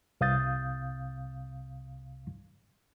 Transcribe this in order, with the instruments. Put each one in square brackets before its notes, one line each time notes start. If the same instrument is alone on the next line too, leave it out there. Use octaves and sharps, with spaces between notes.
[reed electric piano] C2 C3 F5 D#6 G6 A6